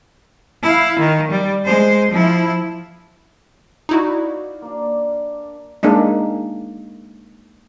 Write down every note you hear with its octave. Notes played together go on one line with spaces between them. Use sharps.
E4 F5
D#3
G3
G#3 C5
F3 E4
D#4 E4 F#4 D5 F5
A#3 D4
G#3 A#3 D4 D#4